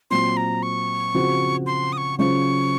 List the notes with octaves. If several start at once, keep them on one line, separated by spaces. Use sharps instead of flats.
A#2 F#3 C4 C6
A#5
C#6
C#3 F3 C4 F#4 C5
C6
D#6
C#6
C#3 F#3 C#4 F4 C5 C#6